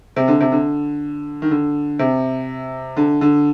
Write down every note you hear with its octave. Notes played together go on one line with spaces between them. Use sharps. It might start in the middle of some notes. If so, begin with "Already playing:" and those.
C3
D3
C3
D3
D#3
D3
C3
D3
D3